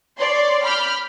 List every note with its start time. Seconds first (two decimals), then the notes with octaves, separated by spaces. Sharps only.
0.19 C#5 D5 C6
0.64 B5 D6 F6 G6